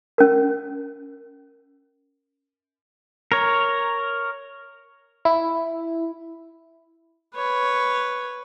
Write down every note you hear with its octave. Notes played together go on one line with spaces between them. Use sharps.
C#4 A#4
A#4 C#5
E4
B4 C#5